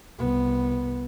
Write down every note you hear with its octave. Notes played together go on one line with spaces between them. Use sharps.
C2 B3